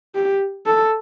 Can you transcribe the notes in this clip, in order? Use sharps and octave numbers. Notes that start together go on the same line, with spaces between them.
G4
A4